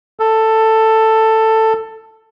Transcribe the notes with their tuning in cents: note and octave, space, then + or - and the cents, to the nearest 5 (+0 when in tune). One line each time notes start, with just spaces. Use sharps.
A4 +10